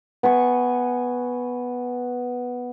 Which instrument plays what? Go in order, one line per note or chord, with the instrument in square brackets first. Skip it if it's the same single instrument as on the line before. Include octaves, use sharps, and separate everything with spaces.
[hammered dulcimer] B3 G#5 C#6